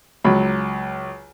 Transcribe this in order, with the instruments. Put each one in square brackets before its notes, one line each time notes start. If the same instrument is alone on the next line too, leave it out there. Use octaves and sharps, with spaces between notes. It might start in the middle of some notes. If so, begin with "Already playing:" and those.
[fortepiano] C#2 F#3 B5